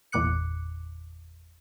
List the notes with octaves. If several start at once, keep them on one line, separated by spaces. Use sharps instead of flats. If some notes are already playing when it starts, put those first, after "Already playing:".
G1 E2 A#2 D6 F#6 C#7